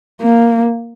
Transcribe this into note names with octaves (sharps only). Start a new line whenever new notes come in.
A#3